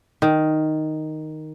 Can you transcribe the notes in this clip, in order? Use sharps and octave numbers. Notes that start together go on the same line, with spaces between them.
D#3